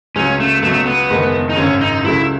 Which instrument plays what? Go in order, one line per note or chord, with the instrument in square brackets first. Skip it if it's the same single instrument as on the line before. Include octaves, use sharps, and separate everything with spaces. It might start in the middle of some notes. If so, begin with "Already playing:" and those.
[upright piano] C#2 C#3 F#3 [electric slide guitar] C#4
[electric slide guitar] A3
[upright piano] C#2 B2 F#3 [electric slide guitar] A3
[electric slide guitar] B3
[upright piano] F#1 E2 D#3 G#3
[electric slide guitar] D#4
[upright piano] G#1 F#2 C#3 [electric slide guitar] C#4
[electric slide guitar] D#4
[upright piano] C#2 C#3 F#3 A3 [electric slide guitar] E4